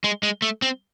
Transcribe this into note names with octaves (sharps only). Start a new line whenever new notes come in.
G#3
G#3
A3
C4